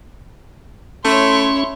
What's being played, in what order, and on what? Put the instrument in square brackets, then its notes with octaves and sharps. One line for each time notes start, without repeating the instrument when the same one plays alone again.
[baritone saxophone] A3 [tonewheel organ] C#4 [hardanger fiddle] E4 C#5 [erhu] C6